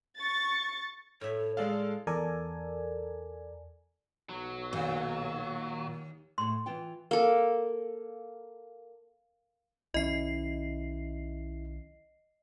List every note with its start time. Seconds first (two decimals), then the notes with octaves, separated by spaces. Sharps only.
0.17 C#6 A6
1.21 A2 C#5 E5
1.57 G#3 A4 D5 F5 C6
2.07 E2 A4 A#4 D5 G#5
4.30 B1 F#3
4.73 D#2 A#2
6.38 A2 A3 C6
6.66 E3 F4 G5
7.11 A#3 A4
9.94 B1 D#3 C#4 E4 D#5 C7